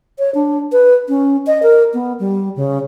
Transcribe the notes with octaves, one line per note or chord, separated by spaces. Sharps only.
C#5
D4
B4
C#4
D#5
A#4
B3
G3
C#3